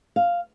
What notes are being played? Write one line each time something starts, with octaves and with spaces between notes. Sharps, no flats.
F5